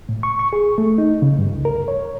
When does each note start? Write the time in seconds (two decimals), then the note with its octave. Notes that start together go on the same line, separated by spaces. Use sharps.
0.09 A2
0.23 C#6
0.39 C#6
0.53 G#4
0.78 A3
0.98 D#4
1.22 C#3
1.39 G2
1.52 C#2
1.65 A#4
1.88 C#5